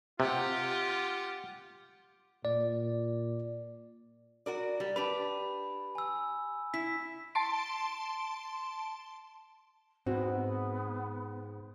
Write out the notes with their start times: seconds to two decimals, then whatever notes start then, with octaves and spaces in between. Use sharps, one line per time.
0.20 C3 F4 G4 F#5
2.45 A#2 D5
4.46 F#4 A#4 D5
4.80 G3
4.96 D4 G4 B4 B5
5.95 G#5 E6
6.74 E4 B6
7.35 A5 C6 D7
10.06 G#2 B3 C4 F#4